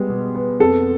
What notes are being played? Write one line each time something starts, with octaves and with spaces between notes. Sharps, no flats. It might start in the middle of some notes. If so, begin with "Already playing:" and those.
Already playing: G3 G#3 B3
B2
B3
F2 A4